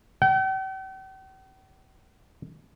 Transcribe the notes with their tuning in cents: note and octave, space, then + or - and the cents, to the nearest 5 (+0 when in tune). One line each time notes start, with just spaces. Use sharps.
G5 -45